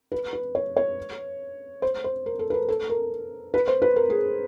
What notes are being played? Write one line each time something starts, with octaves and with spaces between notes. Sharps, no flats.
B4
B4
C#5
C#5
C5
C5
A#4
A4
B4
A#4
A4
A#4
B4
C5
B4
A#4
G#4